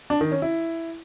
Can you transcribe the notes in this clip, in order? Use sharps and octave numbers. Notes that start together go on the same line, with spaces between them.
D4
D#3
C#4
E4